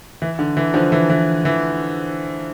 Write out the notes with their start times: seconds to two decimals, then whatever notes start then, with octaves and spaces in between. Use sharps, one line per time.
0.22 E3
0.39 D3
0.57 E3
0.74 D3 F3
0.92 E3
1.10 E3
1.45 E3